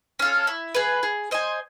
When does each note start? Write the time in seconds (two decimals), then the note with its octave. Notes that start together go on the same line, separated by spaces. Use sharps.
0.19 C#4 F4 A4
0.47 E4
0.75 G#4 B4
1.03 G#4
1.31 C5 D#5 G#5